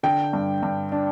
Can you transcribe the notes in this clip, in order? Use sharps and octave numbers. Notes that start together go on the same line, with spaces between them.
D3 G5
G2
G2
D4